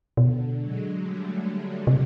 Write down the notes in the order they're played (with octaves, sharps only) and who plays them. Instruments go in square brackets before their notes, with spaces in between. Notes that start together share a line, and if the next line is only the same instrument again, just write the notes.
[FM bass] B2 [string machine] D3
[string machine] F#3 G#3
G3 A3
G3 A3
[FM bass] C3